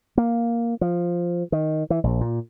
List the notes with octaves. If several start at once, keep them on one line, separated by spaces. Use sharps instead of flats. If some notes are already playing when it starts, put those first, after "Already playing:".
A#3
F3
D#3
E3
A#1
A#2